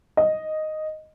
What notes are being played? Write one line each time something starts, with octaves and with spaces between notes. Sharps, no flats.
D#5